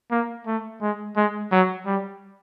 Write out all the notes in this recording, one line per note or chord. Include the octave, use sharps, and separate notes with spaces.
A#3
A3
G#3
G#3
F#3
G3